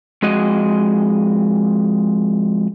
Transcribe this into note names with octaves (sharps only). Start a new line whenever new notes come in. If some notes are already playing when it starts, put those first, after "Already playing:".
F2 G#3 F#4 D#5